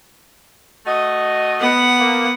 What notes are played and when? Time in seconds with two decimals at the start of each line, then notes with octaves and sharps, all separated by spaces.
0.86 A3 F#4 D#5
1.61 B3 F#5
1.99 A#3